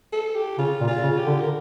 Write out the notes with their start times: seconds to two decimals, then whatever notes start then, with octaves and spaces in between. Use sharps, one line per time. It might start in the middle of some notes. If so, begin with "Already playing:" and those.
0.13 A4
0.35 G4
0.58 C#3 F4
0.81 A#2
0.88 F4
1.03 C#3
1.18 G4
1.26 D3
1.41 A#4